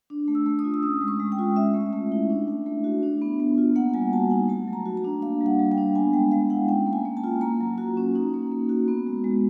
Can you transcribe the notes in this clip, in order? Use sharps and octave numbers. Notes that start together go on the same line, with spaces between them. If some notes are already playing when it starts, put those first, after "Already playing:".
D4
A3
E6
A3
D#6
F4
E6
C#4 D#6
G#3
C#6
G#3
G5
F4
C#4 E5
A3
A3
E4
D4
A3
A3
F#4
D4
B3
B3
F4
A#3 F#5
G3 G#5
F#4 A5
D#4 G#5
A3 A5
F#3
A#5
F#4
A#5
D4
A#3 F5
G3
F#5
G3
G5
D4
B3 G#5
G#3 G5
G#3 F5
E4 F#5
C#4 G5
A#3
G#5
A#3
A5
F4
A#3 A#5
F#3
F#4
C#4
D#4
A#3
A#3
F#4
B3
G#3
G#3